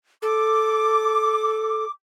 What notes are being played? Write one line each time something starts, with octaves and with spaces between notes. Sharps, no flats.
A4 D6